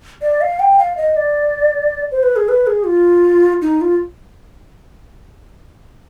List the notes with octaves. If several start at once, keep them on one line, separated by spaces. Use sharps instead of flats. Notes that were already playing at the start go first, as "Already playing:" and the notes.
D5
F5
G5
F5
D#5
D5
C5
B4
G#4
B4
G#4
F4
D#4
F4